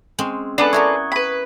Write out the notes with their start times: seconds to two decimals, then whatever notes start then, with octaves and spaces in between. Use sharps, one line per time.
0.18 G#3 C4 C#4
0.58 B3 D4 A4 B4 D5 G#5
0.73 E4 F#4 A#4 C#6 D#6 G#6
1.12 B4 B5